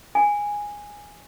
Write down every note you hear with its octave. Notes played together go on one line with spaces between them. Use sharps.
G#5